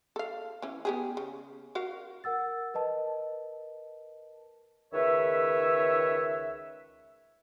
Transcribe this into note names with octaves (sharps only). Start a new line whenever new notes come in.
A4 F5
E3 C#4
B3 G4 G#4
C#3
F#4 A#4 F5
A#4 F#5 E6 A6
A#4 B4 D#5 A5
C#2 D#3 B4 C#5 E5